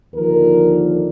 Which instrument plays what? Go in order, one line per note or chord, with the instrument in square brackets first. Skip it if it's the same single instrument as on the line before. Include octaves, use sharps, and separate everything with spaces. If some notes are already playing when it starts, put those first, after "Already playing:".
[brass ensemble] D#2 D3 F3 A#4